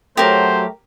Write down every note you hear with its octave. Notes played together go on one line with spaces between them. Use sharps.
F#3 A3 G4 A#4 C5